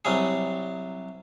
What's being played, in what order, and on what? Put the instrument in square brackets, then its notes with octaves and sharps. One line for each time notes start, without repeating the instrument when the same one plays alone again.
[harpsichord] C2 F#3 G3 G#4